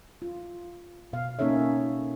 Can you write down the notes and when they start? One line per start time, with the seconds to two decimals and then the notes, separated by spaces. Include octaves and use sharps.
0.22 F4
1.13 B2 F5
1.39 A#3 C#4 D#4 A4 C#5 E5